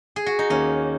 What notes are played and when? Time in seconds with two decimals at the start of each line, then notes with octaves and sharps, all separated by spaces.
0.16 G#4
0.26 F#4
0.39 D#4
0.50 D#2 D#3 A#3 C#4